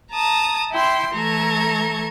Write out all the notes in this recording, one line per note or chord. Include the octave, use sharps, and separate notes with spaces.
A5 A#5 D#6
E4 G5 C6
E3 A3 A4 A#5 C#6 G#6